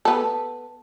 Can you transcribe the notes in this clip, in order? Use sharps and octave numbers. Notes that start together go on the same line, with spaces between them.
B3 A4